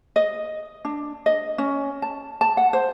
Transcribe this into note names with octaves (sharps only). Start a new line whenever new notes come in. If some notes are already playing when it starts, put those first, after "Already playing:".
D#5
D4
D#5
C#4
A5
A5
F#5
C5